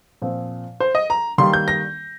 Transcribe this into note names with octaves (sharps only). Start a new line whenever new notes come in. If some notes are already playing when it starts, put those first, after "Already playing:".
A#2 F3 C4
C5
D#5
A#5
D#3 G3 A#3 C6
G6
A#6